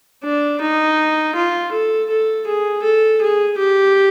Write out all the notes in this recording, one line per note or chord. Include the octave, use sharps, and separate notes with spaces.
D4
D#4
F4
A4
A4
G#4
A4
G#4
G4